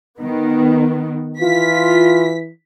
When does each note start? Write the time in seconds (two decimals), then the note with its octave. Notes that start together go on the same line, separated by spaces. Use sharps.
0.19 D#3 B3
1.41 E3 F4 B6